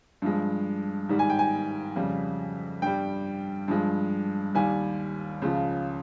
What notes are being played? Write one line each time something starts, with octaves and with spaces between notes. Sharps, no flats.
G2 F3 G#3
G#2 D#3 G3
G#5
G5
G#5
F2 C#3 G3
G2 G3 G5
G2 F3 G#3
D#2 D#3 G3 G#5
C#2 C#3 F3